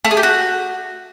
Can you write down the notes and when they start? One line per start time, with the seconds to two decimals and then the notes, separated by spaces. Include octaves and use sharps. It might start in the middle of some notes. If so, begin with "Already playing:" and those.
0.05 A3
0.11 G#4
0.17 G4
0.23 F#4